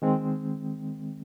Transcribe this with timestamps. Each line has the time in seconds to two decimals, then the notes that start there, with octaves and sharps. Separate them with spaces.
0.02 D#3 G#3 C4